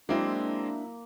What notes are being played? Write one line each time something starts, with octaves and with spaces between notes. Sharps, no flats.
F#3 G#3 A#3 C4 D4 E4